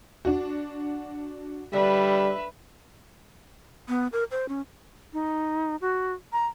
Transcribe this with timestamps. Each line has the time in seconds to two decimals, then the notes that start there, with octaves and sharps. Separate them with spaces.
0.25 D4 F#4
1.73 D3 G3 B4 E5
3.88 B3
4.12 A#4
4.31 C5
4.49 C#4
5.13 D#4
5.81 F#4
6.33 A#5